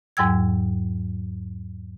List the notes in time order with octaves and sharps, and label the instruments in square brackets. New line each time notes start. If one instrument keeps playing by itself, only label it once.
[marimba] E2 G#2 F#3 G5 E6 G#6